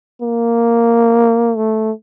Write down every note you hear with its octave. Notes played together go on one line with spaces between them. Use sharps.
A#3
A3